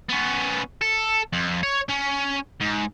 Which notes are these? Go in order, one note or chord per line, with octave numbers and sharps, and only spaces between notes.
B3 C#4
A4
F2
C#5
C#4
G#2